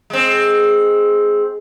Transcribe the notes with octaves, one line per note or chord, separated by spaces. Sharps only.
G#3 C4